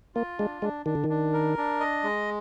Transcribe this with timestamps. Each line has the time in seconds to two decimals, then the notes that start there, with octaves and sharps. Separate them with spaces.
0.15 A#3 F4
0.39 G#3 D4
0.62 G#3 D4
0.86 D#3 D4
0.95 D3
1.04 D#3
1.09 D4
1.33 A#4
1.57 D4
1.80 D#5
2.04 G#3